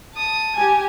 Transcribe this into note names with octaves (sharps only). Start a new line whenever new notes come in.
A5 D#6
G4 G#5